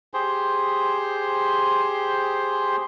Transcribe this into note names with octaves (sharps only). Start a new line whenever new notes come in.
G4 G#4 C5 C6